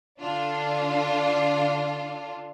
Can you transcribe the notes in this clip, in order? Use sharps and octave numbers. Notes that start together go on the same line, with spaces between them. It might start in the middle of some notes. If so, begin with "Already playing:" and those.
D3 D4 F4